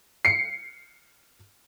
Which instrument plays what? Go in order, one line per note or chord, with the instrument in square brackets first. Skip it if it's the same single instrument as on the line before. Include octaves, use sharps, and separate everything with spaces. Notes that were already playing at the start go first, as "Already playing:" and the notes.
[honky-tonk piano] C7 C#7